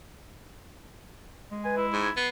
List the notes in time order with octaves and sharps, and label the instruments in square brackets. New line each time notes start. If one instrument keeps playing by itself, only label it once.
[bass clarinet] G#3
[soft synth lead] B4 [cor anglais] G#5
[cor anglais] E4
[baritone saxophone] G#2 [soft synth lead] G#6
[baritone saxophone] B3 [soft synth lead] C7